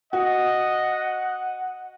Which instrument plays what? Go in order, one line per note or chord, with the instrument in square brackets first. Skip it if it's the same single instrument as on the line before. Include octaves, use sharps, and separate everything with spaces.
[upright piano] F#4 [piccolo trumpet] D#5 [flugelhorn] F#5